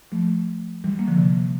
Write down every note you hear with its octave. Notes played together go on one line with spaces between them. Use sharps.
F3 A3
E3 G3
G3 A#3
D3 F3
C3 E3